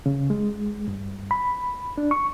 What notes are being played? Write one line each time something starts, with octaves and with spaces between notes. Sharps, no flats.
C#3
G#3
G2
B5
D4
C#6